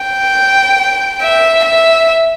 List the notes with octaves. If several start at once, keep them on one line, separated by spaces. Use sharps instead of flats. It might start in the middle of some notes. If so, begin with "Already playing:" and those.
Already playing: G5
E5
E5